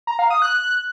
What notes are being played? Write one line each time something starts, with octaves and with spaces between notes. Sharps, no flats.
A#5
F5
D#6
F#6